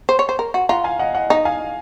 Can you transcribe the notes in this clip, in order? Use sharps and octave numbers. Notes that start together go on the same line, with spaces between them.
C5
C#5
C5
A#4
F#4
F4 F#5 A#5
F5 G#5
D#5 F#5
D#5 F#5
D#4 D#5
F5 G#5